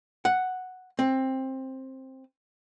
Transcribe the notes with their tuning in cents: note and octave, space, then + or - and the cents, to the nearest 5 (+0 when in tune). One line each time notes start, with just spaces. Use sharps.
F#5 +0
C4 +15